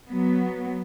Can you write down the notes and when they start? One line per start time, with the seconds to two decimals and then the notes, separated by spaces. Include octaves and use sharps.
0.11 F#3 B3